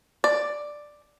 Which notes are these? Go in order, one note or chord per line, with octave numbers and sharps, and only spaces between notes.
D5